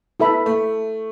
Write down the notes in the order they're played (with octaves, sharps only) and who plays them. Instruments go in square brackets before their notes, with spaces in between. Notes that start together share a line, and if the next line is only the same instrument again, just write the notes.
[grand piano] B3 [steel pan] E4 A4 E5 B5
[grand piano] A3